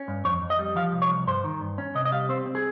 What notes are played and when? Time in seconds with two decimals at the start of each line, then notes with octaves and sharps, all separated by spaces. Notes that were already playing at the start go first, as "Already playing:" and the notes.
Already playing: C#4
0.08 G2
0.25 F2 C#5
0.42 F2
0.50 D#5
0.59 G3
0.76 F3 F5
0.93 C2
1.02 C#5
1.10 C2
1.27 G2 C5
1.44 D#3
1.61 G2
1.78 C#4
1.95 C3 D#5
2.05 D#5
2.12 G3 F5
2.29 C4 C5
2.46 C4
2.55 G#4